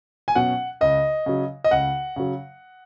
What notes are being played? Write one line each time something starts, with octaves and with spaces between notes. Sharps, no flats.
G#5
B2 F#3 C#4 F#5
C#2 D#5
C#3 F#3
D#5
C#2 F#5
C#3 F#3